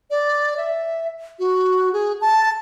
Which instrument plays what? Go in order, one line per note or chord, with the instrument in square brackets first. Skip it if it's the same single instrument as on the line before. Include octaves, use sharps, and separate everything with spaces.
[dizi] D5
E5
F#4
G#4
A5